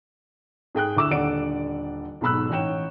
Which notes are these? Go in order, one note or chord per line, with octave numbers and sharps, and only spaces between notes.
G#2 G#4 G5 F#6
D2 E4 D6 E6 E7
D#1 D3 D5 F#5 D7
B1 G#2 B2 B5 E6 F#6
A1 D#4 C#5 G5 E7